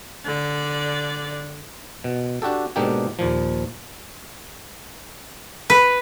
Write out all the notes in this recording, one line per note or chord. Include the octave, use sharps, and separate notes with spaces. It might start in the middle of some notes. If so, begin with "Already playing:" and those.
D3 D5
B2
D4 F#4 G4 A4
G#2 B2 A#3 D4 G4
D#2 A#2 F3
B4